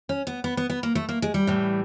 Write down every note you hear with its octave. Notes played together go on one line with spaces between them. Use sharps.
C#4
B3
B3
B3
B3
A#3
A3
A#3
G#3
G3
A2 E3